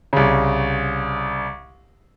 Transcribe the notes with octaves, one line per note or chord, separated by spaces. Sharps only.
C2 C#3